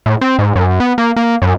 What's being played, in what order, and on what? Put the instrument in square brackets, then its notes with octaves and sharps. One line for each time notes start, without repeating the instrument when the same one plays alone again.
[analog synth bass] A2
C4
G#2
F#2
B3
A#3
A#3
F#2